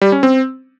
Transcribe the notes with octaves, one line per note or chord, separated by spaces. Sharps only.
G3
C#4
C4